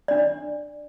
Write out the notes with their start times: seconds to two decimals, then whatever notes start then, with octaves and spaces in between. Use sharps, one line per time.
0.08 D4 D5